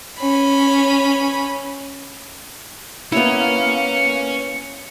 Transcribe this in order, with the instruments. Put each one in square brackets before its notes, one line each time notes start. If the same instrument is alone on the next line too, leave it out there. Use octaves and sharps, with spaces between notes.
[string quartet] C#4 B5
[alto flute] A#3 [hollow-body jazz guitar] B3 E4 [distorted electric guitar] C#4 [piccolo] C#7